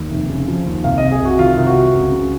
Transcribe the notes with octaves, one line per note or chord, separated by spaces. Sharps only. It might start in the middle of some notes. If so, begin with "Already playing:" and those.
Already playing: D#2
F1
C#3
F3
D#2
C2 F5
C3 D#5
G#4
C2 F#4
D#3 F4
C2
F#4
C3
C#2
C#3